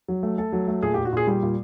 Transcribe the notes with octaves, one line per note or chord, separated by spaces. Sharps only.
F#3
A3
A3 A4
F#3
A3
A#2 G#4
G4
A#2
F#4
A#2 G#4
G3 G4
A#2